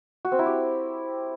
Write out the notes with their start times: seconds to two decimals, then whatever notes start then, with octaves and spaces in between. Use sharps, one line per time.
0.25 F#4
0.32 C4
0.39 E4
0.46 G4